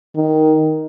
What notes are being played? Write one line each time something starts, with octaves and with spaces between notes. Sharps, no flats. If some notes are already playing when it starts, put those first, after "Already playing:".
D#3